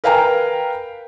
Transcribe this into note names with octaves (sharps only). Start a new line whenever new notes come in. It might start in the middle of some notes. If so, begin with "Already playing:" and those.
A#4 B4 F5 G5 G#5 A#5